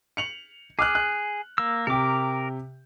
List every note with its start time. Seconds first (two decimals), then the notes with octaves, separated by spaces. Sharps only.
0.17 C#7 F7 F#7
0.79 G#4 D6 F6 F#6
0.95 F#6
1.58 A#3 E6
1.87 C3 G4 A#4 D6